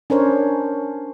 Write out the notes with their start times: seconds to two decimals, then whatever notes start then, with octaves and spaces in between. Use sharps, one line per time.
0.10 C#4 D4 A#4 C5 C#5